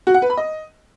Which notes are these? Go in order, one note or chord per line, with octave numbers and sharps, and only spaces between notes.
F#4
F#5
B4
B5
D#5